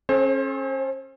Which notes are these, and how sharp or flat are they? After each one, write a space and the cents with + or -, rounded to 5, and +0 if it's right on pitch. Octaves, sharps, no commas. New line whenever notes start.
C#4 -30 A4 -35 C5 +30